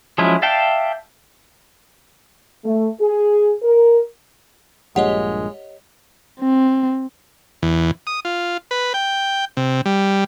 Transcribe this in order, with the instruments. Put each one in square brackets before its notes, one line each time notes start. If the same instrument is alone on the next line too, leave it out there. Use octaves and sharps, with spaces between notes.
[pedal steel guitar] F3 F#3 G#3 C#4 E4
D5 E5 F5 G5 A5
[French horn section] A3
G#4
A#4
[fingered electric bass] A#1 G2 A#2 [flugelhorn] G#3 [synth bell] G4 C#5 D#5 [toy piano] F#5
[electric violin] C4
[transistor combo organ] E2
D#6
F4
B4
G5
C3
G3